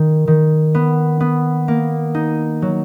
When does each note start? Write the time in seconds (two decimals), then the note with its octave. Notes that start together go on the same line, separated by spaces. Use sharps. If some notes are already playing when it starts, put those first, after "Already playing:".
Already playing: D#3
0.27 D#3
0.75 B3
1.20 B3
1.68 A#3
2.15 D#4
2.62 F#3